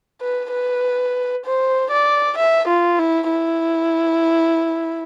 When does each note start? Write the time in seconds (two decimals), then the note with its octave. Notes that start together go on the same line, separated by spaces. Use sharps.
0.21 B4
0.52 B4
1.45 C5
1.91 D5
2.37 E5
2.68 F4
2.99 E4
3.30 E4